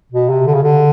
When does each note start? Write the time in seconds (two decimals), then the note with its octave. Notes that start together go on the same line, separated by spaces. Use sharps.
0.12 B2
0.30 C3
0.47 D3
0.54 C#3
0.63 D3